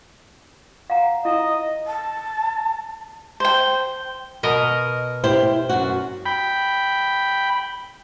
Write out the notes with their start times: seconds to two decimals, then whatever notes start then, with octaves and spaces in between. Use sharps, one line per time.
0.90 F5 F#5 A#5
1.25 E4 D#5 A#5
1.87 A5
3.40 C5 G5
4.43 B2 A#4 D#5
5.24 E4 G4 C5
5.69 F#2 F#4
6.26 G5 B5